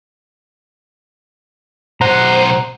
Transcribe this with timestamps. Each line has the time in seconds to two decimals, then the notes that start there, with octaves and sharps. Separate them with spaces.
2.01 B1 C5 F#5 A#5